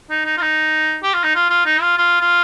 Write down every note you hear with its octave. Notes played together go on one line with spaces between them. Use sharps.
D#4
D#4
F4
D#4
G4
F4
D#4
F4
F4
D#4
F4
F4
F4